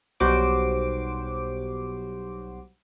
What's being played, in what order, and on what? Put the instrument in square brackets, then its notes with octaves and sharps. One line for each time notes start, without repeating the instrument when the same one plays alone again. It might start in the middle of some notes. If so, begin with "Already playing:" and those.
[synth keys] B1 G3 F#4 C5 D6 D7